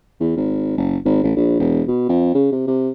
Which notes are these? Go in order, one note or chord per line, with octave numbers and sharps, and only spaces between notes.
E2
G#1
F#1
G#1
A1
A#1
E1
B2
F2
C#3
C3
C3